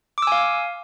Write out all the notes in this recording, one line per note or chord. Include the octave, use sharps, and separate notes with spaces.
F5 G#5 D6 E6